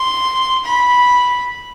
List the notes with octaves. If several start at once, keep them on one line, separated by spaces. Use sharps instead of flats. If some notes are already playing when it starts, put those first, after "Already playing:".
Already playing: C6
B5